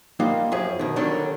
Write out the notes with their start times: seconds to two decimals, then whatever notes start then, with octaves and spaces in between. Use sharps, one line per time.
0.20 G3 A#3 D#4 F4 F#5
0.52 F#2 F3 G#4
0.79 B2 D#3
0.96 D3 D#3 F#3 G3 C#4 D4